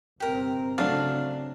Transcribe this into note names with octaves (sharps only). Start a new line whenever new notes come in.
G1 C3 C4 G4 A#4
C#3 F#3 A3 C4 D4 F5